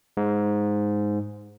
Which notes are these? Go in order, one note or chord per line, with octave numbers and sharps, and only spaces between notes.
G#2